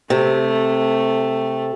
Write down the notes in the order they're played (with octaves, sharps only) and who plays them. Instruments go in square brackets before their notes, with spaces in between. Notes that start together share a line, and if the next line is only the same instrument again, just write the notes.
[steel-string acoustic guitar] C3 [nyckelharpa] A3